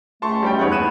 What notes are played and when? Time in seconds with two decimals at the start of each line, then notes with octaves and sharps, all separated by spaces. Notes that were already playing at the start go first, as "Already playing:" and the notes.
0.22 C#2 A3 A5 C6 C#6
0.43 G3 C#4 G5
0.59 D#2 B3 E4 G#4 C#5 F#5
0.72 F#6 D#7 E7